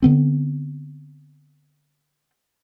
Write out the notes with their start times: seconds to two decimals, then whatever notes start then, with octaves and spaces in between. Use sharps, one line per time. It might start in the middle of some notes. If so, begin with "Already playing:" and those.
0.02 D3 B3 C4